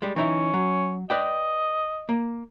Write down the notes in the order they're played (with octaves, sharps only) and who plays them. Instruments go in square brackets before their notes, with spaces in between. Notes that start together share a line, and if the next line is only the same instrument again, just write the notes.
[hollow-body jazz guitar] G3 G#3
[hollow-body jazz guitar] E3 D#4 E4 [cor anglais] C#4
[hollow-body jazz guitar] F#3
[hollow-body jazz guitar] B4 D5 G5 [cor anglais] D#5
[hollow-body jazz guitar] A#3